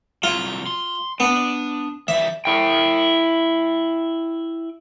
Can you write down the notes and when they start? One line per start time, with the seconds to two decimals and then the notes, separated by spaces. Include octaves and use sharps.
0.23 C2 F#3 F4
0.67 C6
1.20 B3 D4
2.08 E3 G3 E5
2.45 E4 G5